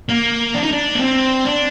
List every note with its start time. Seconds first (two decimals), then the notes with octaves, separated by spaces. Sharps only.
0.10 A#3
0.55 D4
0.63 D#4
0.72 D4
0.95 A#3
1.00 C4
1.45 D4